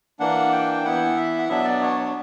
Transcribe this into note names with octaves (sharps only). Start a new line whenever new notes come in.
E3 A#3 D4 F#5
G5
E3 B3 E4 F#5
E5
F#5
B2 F#3 B3 D4 E5
D5
C#5
C#5